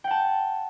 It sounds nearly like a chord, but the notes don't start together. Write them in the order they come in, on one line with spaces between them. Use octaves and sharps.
G5 F#5 A5